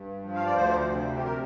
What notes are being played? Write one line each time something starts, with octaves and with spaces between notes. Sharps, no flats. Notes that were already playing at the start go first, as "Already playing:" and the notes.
Already playing: G2
F3
F5
D5
D2 C5
C3
G4
A#4